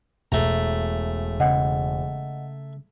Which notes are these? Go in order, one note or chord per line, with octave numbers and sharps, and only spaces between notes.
E1 B2 A3 A#5
C#3 D#5 F#5